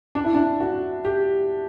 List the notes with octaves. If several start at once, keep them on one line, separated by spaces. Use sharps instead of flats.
D4
E4
D4
F#4
G4